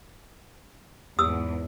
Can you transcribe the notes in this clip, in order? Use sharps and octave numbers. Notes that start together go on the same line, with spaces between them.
E2 G#2 D#6 E6